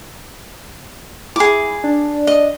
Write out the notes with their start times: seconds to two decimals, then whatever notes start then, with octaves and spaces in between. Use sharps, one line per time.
1.36 E4 G#4 D6
1.84 D4
2.27 D#5